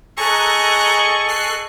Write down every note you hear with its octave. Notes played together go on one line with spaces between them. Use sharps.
G#4 A4 D#5 A#5 C#6 F#6
F#6 C7